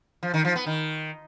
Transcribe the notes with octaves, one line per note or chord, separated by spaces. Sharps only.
F3
D#3
F3
B3
D#3